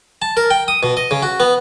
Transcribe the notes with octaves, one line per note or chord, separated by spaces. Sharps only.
A5
A#4
G5
D#6
B2
D#5
C#3
F#4
B3